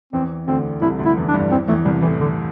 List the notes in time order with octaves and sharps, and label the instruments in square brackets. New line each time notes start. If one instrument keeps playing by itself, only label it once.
[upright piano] E2 E3 [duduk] C4
[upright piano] D2 D3 [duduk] C4
[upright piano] C2 C3 [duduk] E4
[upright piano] D2 D3
[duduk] E4
[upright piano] E2 E3
[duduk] D4
[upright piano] G2 G3
[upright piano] E2 E3 [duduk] C4
[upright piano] E2 E3 [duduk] A3
[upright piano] C2 C3 [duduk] G3
[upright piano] A2 [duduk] E3
[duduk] D3